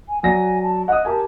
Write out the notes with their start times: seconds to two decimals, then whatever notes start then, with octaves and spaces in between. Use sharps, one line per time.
0.09 G#5
0.23 F#3 D5 G#5 A#6
0.63 A5
0.88 D#5 F#5 D#6
1.05 G4 A#4 G#5 A5